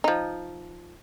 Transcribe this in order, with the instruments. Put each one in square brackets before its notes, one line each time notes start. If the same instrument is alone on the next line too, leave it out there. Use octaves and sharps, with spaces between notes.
[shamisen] F3 D#4